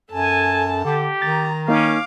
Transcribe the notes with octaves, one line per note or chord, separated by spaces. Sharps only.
F#2 A4 G#5 A5
D3 G4
D#3 A#5 A6
A#3 C#4 D#4 F5 D6